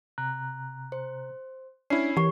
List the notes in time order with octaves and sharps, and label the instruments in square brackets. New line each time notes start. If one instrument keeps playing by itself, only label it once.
[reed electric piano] C3 A#5 F#6
[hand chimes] C5
[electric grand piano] C#4 E4 [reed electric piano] D4 [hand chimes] C7
[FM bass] E3 [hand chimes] G4 C#6 [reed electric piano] A#4 C#5